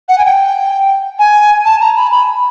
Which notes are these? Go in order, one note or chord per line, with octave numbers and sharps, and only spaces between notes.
F#5
G#5
G5
G#5
A5
A#5
B5
B5